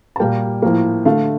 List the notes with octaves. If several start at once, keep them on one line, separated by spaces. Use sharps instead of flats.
A5
A#2 G3 A#3 G5
A2 F3 A#3
D3 A3 F5